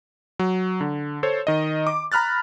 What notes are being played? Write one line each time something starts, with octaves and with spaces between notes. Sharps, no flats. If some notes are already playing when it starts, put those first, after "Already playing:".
F#3
D3
A4 C5 C#5
D#3 D#5
D6
A#5 B5 F6 F#6 A6